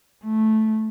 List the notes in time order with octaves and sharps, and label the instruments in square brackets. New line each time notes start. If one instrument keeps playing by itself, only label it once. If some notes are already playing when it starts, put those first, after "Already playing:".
[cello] A3